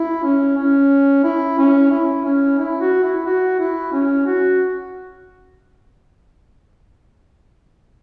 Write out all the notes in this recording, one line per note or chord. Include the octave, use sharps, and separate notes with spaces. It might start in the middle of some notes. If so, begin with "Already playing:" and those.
Already playing: E4
C#4
C#4
E4
C#4
E4
C#4
E4
F#4
E4
F#4
E4
C#4
F#4